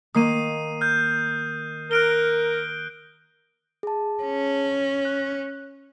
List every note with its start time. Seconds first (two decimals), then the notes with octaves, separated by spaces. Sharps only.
0.15 D#3 A#3 D#6 C7 D#7
0.81 F6 G6
1.91 A#4 F#6 D7 G7
3.83 G#4 A5
4.23 C#4
5.05 F#6